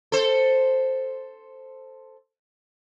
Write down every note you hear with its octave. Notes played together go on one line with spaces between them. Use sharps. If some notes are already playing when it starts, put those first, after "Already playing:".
A4 C5